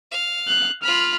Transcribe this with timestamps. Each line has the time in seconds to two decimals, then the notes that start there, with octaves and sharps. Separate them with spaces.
0.11 F5
0.48 F#6
0.83 F4 B5 F6